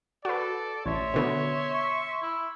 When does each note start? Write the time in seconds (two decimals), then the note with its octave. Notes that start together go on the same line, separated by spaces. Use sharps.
0.25 F#4 A4 B4 D5
0.86 A1 C#5 E5 C6
1.14 B2 D3 B3
1.74 C#6
2.22 E4